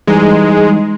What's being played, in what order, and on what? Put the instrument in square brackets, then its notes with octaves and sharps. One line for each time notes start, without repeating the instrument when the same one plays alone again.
[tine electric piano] E3 G3 D#4 [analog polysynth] G#3